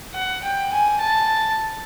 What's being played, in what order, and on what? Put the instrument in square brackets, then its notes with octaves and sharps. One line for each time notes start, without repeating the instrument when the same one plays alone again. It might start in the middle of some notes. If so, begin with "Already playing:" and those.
[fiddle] F#5
G5
G#5
A5